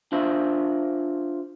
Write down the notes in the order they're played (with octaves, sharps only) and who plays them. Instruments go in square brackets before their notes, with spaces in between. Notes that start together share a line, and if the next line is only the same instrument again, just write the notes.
[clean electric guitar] D4 F4 C5 E5